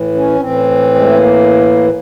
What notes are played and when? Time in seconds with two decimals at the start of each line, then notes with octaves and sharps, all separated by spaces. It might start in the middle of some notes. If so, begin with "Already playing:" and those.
Already playing: A2 E3
0.14 C#4
0.39 A2 E3 C4
0.95 G#3
1.04 A3
1.15 A#3